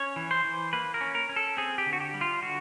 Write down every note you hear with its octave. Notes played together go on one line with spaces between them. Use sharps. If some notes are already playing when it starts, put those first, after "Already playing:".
Already playing: C#4 C#5
E3
C5
E3
A#3 B4
A#4
C#4
A#4
C#4
A4
C4 G#4
G4
D3
F#4
G4
G3
F4
D3 F#4